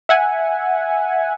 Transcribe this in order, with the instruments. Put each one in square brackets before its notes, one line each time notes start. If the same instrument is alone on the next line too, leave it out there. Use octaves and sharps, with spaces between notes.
[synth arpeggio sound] E5 F#5 G#5